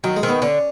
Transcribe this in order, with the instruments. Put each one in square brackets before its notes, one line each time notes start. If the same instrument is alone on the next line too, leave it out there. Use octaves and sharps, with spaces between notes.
[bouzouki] D#3 [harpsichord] F#3
[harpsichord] G#3
[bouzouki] D#3 [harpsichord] C4
[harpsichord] B3
[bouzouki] D3 [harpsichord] C#4